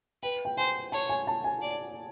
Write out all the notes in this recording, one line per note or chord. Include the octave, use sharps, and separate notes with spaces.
B4 G5
G5
C5 G#5
C#5 A5
G#5
A5
G#5
D5